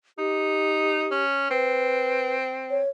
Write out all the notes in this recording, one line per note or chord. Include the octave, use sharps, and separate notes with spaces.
D#4 G4
C#4
C4 B4
C#5